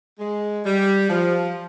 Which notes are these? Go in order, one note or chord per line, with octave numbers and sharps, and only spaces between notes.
G#3
G3
F3